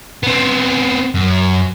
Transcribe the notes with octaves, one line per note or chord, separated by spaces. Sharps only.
B3 C4
F#2